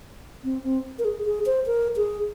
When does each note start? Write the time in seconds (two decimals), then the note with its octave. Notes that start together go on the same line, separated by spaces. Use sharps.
0.44 C4
0.64 C4
0.99 A#4
1.05 G#4
1.25 G#4
1.46 C5
1.67 A#4
1.96 G#4